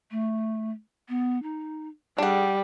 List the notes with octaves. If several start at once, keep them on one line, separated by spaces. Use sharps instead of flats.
A3
B3
D#4
G3 D4 G#4 F#5